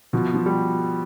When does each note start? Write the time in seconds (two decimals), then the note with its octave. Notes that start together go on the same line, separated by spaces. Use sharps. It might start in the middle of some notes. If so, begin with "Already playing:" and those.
0.13 B2 F3
0.34 F3
0.46 G3